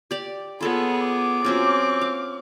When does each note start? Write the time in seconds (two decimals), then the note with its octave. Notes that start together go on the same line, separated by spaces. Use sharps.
0.11 G4 D5
0.61 B3 F4 G#4 A4 C#5 B5
1.06 D6
1.45 F#3 C4 C#4 F4
2.01 F5